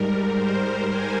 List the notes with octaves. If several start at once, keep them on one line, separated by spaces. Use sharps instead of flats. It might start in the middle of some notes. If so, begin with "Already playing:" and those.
Already playing: G#2 G3 A#4
C5
G#5